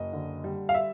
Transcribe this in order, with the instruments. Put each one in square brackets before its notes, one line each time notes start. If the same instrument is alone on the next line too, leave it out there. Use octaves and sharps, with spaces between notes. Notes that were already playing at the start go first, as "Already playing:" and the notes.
Already playing: [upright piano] F#1 D#5
D3
G3
F5
E5